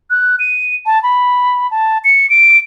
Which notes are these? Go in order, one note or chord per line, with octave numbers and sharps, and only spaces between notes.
F#6
D#7
A5
B5
A5
C#7
D7